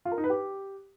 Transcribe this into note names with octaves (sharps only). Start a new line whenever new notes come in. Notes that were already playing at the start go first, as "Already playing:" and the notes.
F4
A#4
D#4
B4
G4